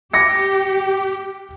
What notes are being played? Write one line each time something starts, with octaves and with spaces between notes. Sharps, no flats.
G4 D6 A#6 C#7